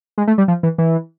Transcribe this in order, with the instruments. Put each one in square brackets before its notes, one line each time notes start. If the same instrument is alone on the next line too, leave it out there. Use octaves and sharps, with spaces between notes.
[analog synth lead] G#3
A3
G3
F3
E3
E3